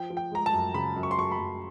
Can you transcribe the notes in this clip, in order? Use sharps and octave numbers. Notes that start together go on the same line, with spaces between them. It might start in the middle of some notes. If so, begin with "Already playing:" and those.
Already playing: F3 G5
F3
G5
G#3 A#5
A5
F#2
C#3 B5
F#2
C#6
C6
F#2 C#6
B5
F#2